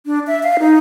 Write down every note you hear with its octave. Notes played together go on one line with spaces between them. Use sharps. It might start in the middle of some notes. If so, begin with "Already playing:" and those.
D4
E5
F5
D#4